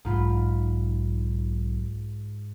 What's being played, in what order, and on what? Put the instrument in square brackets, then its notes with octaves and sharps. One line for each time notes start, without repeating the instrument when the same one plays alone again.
[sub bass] B1 [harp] G#2 F4 B5